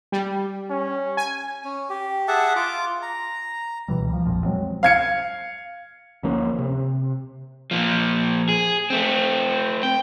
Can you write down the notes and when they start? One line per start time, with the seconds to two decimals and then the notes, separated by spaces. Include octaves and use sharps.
0.12 G3
0.70 C#4
1.17 G#5
1.64 C#4
1.89 G4
2.28 G#4 E5 F#5 A5
2.56 F4 D6
3.02 A#5
3.88 C#2 B2 E3 G3
4.10 F3 G3
4.25 A#1 F2 A#2 F3
4.45 F3 F#3 G#3 C4
4.83 F5 G#6 C#7
6.23 D2 F3 A#3 C#4
6.59 C3
7.71 A#2 F3
8.49 G#4
8.90 A3 C4
9.83 G5